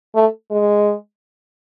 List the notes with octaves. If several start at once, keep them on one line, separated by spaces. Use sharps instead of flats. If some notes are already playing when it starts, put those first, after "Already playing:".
A3
G#3